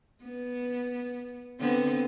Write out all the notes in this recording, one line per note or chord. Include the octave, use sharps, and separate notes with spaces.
B3
D3 B3 C4